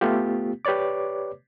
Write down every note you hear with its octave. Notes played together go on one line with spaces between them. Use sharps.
A3 B3 F4 G4
G4 B4 C#5 D5 D6